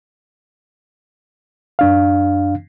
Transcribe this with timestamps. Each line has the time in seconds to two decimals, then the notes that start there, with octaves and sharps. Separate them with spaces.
1.79 F#2 D4 F5